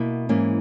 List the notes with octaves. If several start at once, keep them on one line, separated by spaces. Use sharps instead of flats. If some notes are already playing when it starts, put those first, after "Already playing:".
Already playing: B2 A#3 E4
G#2 E3 A#3 C#4